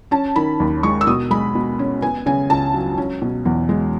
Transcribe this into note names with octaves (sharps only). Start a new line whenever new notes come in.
C#4 A5
D#3 B5
D#2
G#3 C#6
E6
B2 D#6
G#3 B5
B2
C#4
B3 G#5
C#3 G#5
C#2 A5
F#3
C#4
B2
E2
G#3